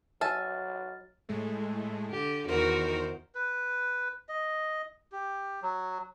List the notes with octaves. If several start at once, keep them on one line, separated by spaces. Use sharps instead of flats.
F#3 E5 G#5 A5 F6 A6
A2 G#3 A3
D3 G4
E2 D#3 F#4 A#4 C5
B4
D#5
G4
F#3